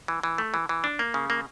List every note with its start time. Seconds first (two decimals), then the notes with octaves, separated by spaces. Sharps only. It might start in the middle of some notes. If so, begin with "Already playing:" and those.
0.08 E3
0.23 E3
0.38 A3
0.54 E3
0.69 E3
0.84 D4
0.99 A#3
1.14 C#3
1.30 A#3